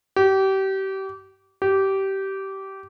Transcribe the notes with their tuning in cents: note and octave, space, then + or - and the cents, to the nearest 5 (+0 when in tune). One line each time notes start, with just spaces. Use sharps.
G4 -30
G4 -20